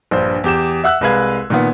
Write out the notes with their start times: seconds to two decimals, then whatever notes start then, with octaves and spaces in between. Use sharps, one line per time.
0.11 A#1 G2 C5
0.44 E2 G4 E7
0.84 E5 F#5 E6 F#6
1.01 C2 G#3 B4 F5 G#6
1.50 A#2 D#3 B3